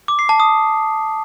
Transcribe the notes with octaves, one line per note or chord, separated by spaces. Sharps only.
D6
C7
A5
D#6